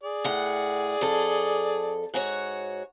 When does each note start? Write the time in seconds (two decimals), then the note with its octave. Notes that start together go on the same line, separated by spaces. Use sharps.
0.04 G#4 D5
0.24 A2 F#5
1.01 F2 A4
2.14 G#2 F#4 C#5